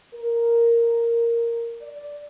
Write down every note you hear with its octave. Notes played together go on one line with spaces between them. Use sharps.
A#4
D5